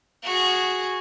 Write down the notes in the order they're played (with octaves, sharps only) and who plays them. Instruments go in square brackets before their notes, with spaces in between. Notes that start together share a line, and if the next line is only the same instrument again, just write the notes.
[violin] F#4 G#4